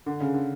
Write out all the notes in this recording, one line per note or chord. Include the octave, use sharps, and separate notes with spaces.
D3
C#3
D3